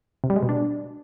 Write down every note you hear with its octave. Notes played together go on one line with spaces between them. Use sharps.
C3
G3
G#3
B2
D4